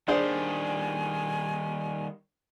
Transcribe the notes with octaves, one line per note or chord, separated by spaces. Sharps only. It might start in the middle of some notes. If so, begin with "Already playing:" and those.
D#3 G3 D4 G#4 C5 D5 G#5